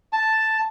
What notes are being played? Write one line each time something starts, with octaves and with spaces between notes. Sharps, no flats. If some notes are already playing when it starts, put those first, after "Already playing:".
A5